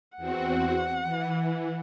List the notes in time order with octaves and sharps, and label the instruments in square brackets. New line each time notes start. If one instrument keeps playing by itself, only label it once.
[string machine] E2 C4 F#4 [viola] F#5
[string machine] E3